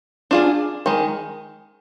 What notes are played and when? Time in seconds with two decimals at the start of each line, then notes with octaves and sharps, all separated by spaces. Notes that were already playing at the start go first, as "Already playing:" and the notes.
0.31 D4 F4 G#4
0.86 D#3 G#3